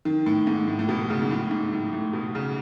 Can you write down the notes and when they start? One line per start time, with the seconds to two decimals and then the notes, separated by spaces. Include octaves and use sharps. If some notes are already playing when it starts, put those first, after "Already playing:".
0.05 D#3
0.26 A2
0.47 G#2
0.67 A2
0.79 A2
0.89 B2
1.10 C#3
1.22 G#2
1.31 A2
1.51 G#2
1.73 A2
1.93 A2
2.13 B2
2.35 C#3